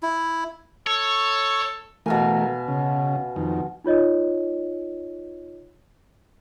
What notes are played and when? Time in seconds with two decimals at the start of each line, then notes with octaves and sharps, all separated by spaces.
0.03 E4
0.87 A4 C#5
2.06 B2 E3 A3 A#4 F5 G#5
2.68 C#3
3.36 F2 D#3
3.84 D#4 F4 C#5 D#5